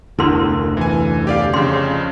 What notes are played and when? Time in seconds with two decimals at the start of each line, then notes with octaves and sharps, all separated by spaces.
0.19 F1 D2 E4 A#4 C6
0.77 E3 G#5
1.27 G4 D5 F5
1.54 F2 C#3 C6